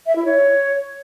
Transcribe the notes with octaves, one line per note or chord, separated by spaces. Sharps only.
E5
E4
C#5